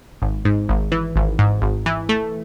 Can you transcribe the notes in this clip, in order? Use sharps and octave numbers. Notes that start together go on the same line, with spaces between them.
G#1
G#2
G#1
E3
G#1
G#2
G#1
E3
A3